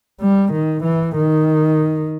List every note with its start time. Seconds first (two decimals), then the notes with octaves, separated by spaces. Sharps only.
0.21 G3
0.53 D#3
0.84 E3
1.16 D#3